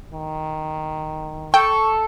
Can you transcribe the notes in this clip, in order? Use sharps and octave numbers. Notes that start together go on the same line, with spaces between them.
D#3
A4 G5 C#6